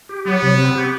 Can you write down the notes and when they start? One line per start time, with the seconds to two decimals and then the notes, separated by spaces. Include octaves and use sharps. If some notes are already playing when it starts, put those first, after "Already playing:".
0.09 G4
0.25 F#3 B3
0.42 C3
0.58 C4
0.75 G4